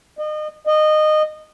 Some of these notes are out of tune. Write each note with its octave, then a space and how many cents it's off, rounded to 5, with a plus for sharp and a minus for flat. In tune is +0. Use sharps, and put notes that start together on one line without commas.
D#5 -35
D#5 -20